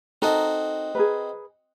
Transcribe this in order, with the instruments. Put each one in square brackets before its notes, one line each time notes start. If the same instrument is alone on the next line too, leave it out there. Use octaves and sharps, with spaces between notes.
[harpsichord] C4 F#4 D#5 [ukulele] D#4 A4 A#4
[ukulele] G#4 A#4 B4